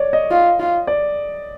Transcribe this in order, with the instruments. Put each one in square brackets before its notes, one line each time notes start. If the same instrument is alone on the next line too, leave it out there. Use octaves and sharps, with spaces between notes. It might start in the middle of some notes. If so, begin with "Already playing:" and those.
Already playing: [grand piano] C#5 D5
D#5
[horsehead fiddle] F4
F4
[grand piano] D5